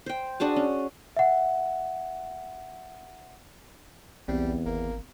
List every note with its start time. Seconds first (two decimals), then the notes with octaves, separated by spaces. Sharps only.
0.06 C5 G5
0.40 D4 F#4 G#4 A5
0.56 C#4
1.17 E5 F#5
4.28 B1 E2 G3 B3 C4
4.66 G#1 A#3